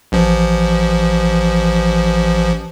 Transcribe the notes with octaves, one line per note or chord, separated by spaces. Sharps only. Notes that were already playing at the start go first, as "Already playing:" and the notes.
A1 F3